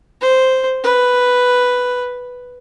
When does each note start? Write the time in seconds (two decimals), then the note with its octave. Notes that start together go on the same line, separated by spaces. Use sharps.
0.21 C5
0.84 B4